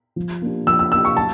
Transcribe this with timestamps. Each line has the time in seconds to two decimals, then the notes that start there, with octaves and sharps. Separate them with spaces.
0.16 F3
0.42 A#3 D4 G4
0.67 F3 E6
0.79 E6
0.92 A#3 D4 G4 E6
1.05 C#6
1.17 F#3 A5